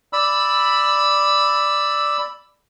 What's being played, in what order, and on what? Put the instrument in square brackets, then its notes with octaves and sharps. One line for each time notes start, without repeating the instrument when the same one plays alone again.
[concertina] D5 B5 E6